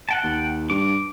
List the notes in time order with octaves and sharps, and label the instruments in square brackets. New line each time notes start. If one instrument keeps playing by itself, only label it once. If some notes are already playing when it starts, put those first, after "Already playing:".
[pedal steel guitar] F#5 G5 A5
[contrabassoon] D#2
[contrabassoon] G2 [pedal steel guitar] D6